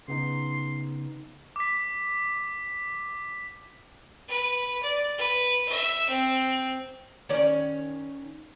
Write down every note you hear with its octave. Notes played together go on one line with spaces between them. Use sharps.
C#3 B3 D#4 C6
D6 B6
B4
D5
B4
E5
C4
D#3 C#4 D5